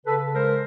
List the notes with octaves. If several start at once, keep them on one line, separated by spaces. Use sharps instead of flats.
C#3 A4 B4
G#3 A#4 C5